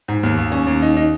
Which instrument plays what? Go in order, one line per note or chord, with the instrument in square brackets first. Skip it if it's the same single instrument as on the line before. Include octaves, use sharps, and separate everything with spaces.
[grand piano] G#2
D#2
D#2
C#4
D#2
D#4
D#4